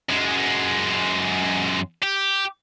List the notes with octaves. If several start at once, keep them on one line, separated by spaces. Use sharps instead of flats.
F#2 G#3
G4